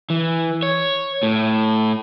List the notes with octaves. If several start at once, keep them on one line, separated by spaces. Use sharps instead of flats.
E3
C#5
A2